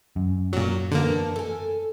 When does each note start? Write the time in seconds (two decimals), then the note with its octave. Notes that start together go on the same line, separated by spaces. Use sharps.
0.16 F#2
0.53 A#2 F#3 F#4
0.92 E2 D3 A#3 A#4 A5
1.36 A4 G#5